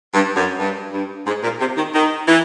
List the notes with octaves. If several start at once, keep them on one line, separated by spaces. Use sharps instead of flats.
G2
F#2
G2
G2
G#2
A#2
C3
D#3
D#3
E3